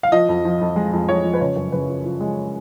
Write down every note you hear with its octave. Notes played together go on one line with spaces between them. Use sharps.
F5
F3 D#5
F2
F3
F2
G#3
F2
F2 C#5
F3
B4
C#3 C#5
F#2
C#3 B4
F3
F3
G#3